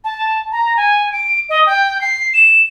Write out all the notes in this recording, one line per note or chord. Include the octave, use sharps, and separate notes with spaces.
A5
A#5
G#5
D7
D#5
G5
C7
E7